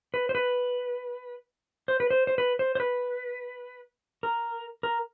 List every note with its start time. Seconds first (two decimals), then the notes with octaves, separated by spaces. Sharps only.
0.14 B4
0.29 C5
0.35 B4
1.88 C5
2.00 B4
2.10 C5
2.27 C5
2.38 B4
2.59 C5
2.75 C5
2.80 B4
4.23 A#4
4.83 A#4